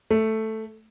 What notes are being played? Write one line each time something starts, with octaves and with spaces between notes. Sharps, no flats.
A3